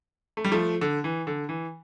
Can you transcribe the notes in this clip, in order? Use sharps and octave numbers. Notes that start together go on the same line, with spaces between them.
A3
G3
F3 A3
D3
E3
D3
E3